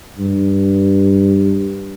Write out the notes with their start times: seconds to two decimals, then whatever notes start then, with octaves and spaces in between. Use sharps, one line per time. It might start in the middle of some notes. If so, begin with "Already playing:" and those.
0.19 G2